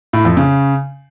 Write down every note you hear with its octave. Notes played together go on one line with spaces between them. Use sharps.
A2
F2
C#3